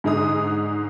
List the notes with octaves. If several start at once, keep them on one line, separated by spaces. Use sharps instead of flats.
G#2 D3 G#3 G#4 D#6